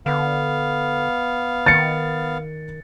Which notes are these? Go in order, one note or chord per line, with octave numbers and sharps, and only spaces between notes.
D3 B3 F5
D#3 A6 C#7